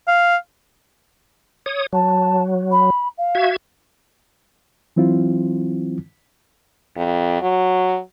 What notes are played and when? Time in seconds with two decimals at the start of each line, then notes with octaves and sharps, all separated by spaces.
0.08 F5
1.66 C#5 D#6
1.93 F#3 A5
2.71 B5
3.17 F5
3.35 F#4 E5 G#6
4.96 E3 F#3 C4 E4 F4
6.97 F2
7.41 F#3